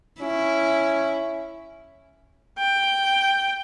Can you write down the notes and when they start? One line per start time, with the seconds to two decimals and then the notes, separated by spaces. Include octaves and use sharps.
0.21 C#4 E4
2.58 G5